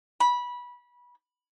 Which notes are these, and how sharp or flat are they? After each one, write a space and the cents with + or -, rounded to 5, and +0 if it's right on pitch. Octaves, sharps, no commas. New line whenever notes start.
B5 -20